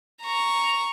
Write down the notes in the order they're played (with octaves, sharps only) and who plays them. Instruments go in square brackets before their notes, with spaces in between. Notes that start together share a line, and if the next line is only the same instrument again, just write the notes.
[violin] A#5 C#6